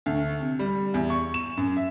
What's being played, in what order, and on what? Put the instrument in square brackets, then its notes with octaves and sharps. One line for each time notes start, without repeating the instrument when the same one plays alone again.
[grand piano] D2
C3
G3
E2
C#6
E7
F#2
E5